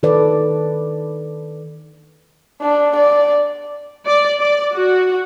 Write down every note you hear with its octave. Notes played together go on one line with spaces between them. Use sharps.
D#3 A4 B4 D5
D4
D5
D5
D5
F#4